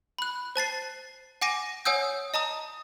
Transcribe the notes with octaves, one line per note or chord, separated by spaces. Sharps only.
B5 F#6
C5 A5 A6 C7
F#5 G#5 D6 A#6 D#7
C#5 F#5 G#5 D#6 E6 G6
D#5 A5 A#5 D#6